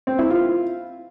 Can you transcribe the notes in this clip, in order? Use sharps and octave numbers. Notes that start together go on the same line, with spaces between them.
C4
E4
F4